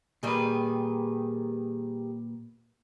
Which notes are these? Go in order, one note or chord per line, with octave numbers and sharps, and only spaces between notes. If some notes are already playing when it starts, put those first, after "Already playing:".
A#2 D#3 G3 G#4 B4